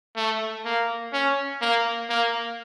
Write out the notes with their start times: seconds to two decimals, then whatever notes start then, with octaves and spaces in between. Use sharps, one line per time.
0.16 A3
0.65 A#3
1.13 C#4
1.61 A#3
2.09 A#3